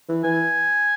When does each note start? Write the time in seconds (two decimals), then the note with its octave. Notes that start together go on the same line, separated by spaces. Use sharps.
0.09 E3
0.24 E3 G#5